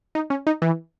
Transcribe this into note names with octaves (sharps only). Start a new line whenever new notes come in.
D#4
C#4
D#4
E3